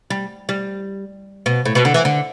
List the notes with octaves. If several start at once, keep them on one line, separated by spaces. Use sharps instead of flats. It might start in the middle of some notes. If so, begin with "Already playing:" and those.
G3
G3
B2
A2
B2
D3
E3
D3